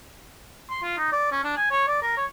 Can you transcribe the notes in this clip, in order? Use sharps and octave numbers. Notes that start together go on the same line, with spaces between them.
C6
F4
D#4
D5
C#4
D4
G#5
C#5
D5
A#4
C#5